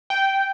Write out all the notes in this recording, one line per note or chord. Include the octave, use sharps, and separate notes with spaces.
G5